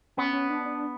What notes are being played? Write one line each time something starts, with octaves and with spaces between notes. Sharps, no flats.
B3 C#4
C#4
D4
D4